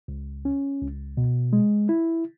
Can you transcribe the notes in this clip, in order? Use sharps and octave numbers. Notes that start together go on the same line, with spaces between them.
C#2
C#4
C#2
B2
G#3
E4